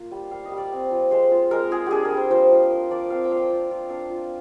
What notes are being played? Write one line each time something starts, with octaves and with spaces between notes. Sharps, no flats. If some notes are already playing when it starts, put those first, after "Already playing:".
Already playing: A#3 F4
G3
G3 F5
D#5
G3
D5
C4
F3
G#3 C5
F4
G#3 A#4
F4 G#4
D4 G4 G#4
A#4
G3
C5
F3 C5
F3
F3 A#4
F3 D5
C4 F5
G5
F3 F5
G5
F4
F4
D4 F5
F4